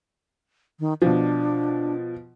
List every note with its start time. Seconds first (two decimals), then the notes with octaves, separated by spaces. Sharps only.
0.80 D#3
1.02 B2 F3 D4